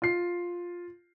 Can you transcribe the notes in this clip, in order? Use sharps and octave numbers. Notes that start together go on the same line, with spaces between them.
F4 C7